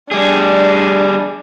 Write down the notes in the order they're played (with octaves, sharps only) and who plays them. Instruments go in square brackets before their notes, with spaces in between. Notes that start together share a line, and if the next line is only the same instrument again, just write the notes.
[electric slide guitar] G3 G#4 [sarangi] D4